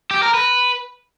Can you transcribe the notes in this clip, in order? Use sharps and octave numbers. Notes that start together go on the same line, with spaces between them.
G4
A#4
B4